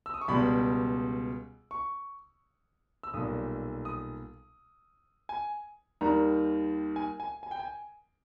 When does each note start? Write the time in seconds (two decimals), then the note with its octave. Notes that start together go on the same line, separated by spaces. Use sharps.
0.06 E6
0.14 D#6
0.21 C#6
0.28 C#2 B2 G3 B5
1.71 C#6
3.03 E6
3.14 B1 A#2 G3 D#6
3.85 D#6
5.29 G#5
6.01 D#2 D#3 G3 A#5
6.96 G#5
7.20 G#5
7.43 G#5
7.51 G5
7.60 G#5